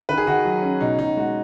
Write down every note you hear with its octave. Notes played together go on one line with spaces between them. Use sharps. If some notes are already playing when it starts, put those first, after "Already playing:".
D#3 B4
G#4
D#3 F#4
F#3
C#4
B2 D#4
B2 D#4
G#3 F#4